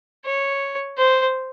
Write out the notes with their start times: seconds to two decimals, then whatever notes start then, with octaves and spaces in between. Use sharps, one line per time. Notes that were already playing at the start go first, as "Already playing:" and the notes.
0.25 C#5
0.98 C5